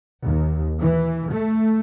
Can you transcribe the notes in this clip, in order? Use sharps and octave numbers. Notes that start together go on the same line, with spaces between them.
D#2
E3
A3